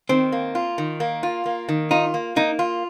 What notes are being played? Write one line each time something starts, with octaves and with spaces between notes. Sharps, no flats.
D#3 C4
A#3
F4
D#3
A#3
F4
A#3
D#3
D#4 F4
A#3
A#3 D#4
F4